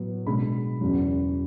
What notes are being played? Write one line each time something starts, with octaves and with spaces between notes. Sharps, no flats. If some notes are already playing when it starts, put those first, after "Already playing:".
Already playing: A2 F#3 B3
B2 G#3 D4 B5
E2 C#3 F#3